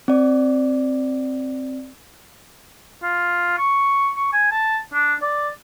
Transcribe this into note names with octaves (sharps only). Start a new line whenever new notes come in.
C4 D5
F4
C#6
C#6
G#5
A5
D4
D5